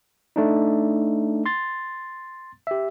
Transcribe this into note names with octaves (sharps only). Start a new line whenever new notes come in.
A3 D4 D#4
C6 A6
G4 E5